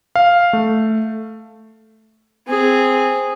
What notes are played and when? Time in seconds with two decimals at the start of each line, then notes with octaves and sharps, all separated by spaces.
0.16 F5
0.53 A3
2.47 C4 G#4